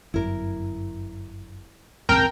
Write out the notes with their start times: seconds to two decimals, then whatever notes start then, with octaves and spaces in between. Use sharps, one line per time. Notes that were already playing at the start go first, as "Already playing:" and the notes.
0.14 G1 F#2 E4 A#4
2.09 A#1 E2 G#2 C4 A#4 G5 A5